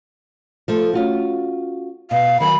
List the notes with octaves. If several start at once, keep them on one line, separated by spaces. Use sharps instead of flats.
F3 A3 A4
C#4 F4 F#4
B2 F5
D#3 F#3 G#5 B5